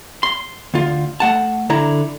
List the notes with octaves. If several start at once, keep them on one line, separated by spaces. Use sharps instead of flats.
C6
D2 F4
A3 F#5 A5
D3 E4 A#5